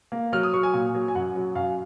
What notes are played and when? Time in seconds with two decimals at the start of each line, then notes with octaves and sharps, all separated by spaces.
0.12 A#3
0.33 F#3 F6
0.43 D#6
0.53 F#3 C#6
0.63 G#5
0.73 A#2
0.94 F#3
1.08 G#5
1.15 F#2 F#5
1.36 F#3
1.55 F#2 F5